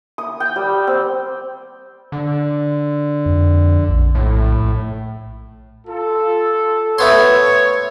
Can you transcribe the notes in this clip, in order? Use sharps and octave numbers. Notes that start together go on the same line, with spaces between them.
D#6
G5
G3
C4
D3
F2
A#1
A2
F4 A4
A3 B3 C#5 C6